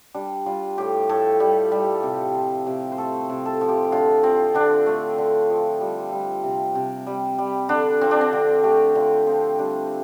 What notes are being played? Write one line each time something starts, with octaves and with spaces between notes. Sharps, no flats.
G3 D4
G3 F4
A2 G4
A2 A4
G3
G3
C3
F3
C3
C5
A3 A4
C5
C3
A4
F3
G4
D3 F4
F3 C4
D3 D4
A3
D3
F3
G3
G3
C3
C3
G3
G3
D3 D4
F3 C4
D4
C4
D3 D4
A3 G4
D3 F4
F3 C4
G3 D4